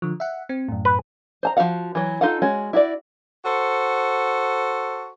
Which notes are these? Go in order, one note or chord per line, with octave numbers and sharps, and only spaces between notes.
D3 F3
E5 F#5
C4
F#2 A2
B4
C5 A5 A#5
F3 D#4 F#4 F5 F#5
E3 F#3
D#4 F4 A4 F5 F#5
G#3 C#4 F#4
E4 F#4 D5
F#4 A4 C5